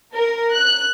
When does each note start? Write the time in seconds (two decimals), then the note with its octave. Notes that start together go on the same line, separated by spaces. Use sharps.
0.14 A#4
0.52 F#6